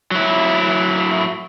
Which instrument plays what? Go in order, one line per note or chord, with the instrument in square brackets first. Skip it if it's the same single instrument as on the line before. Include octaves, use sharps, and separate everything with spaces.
[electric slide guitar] F#3 E4